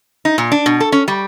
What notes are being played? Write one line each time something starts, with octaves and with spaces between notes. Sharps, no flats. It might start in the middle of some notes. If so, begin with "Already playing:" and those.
D#4
A#2
D4
B2
A4
C#4
G3